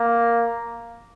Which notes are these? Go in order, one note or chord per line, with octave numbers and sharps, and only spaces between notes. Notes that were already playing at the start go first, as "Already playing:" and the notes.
Already playing: A#3